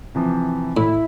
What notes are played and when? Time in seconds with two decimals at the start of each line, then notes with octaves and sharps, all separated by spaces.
0.15 C3 E3 F3
0.77 A2 E4